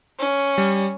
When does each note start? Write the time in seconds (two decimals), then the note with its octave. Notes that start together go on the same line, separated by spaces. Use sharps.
0.18 C#4
0.58 G3